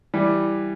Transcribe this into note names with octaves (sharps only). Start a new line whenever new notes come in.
E3 G3